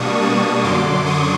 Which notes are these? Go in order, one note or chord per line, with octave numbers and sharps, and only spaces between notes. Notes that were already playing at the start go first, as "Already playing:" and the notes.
Already playing: B2 G3 A#3 D4 C#6 D#6
C#6 D#6
F#2 D3 F#3 C6 D6
C#6 D#6